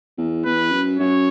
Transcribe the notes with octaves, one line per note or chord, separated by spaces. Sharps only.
E2
E2 B4
F#2
F#2 C#5